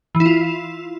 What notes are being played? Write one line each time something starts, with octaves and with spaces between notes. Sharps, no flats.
E3
E4
F4